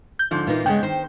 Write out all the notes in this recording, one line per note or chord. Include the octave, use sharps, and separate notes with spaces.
G6
G#2 D3 F3
A#2 E3 A#3 D#4 F4
G2 C#3 G#3 B3 C#4 G5
D#3 C5